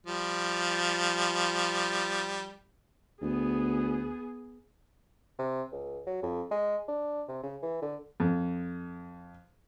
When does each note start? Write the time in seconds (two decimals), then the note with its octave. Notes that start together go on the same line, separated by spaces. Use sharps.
0.07 F3 G3
3.22 D2 B3 G#4
5.39 C3
5.72 C#2
6.06 F#3
6.23 F2
6.51 G#3
6.88 D4
7.29 C3
7.43 C#3
7.63 E3
7.82 D3
8.20 F2